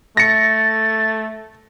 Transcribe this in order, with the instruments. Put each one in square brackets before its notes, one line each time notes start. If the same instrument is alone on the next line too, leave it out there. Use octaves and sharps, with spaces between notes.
[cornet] A3 [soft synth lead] A6 [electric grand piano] A#6 C#7